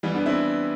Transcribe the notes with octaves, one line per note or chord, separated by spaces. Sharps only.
E3 G3
B3 D4
C4 E4